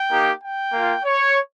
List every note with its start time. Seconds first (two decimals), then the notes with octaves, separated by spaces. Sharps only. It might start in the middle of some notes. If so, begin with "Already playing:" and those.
Already playing: G5
0.09 A#3 D#4 G4
0.41 G5
0.73 A#3 F4
1.05 C#5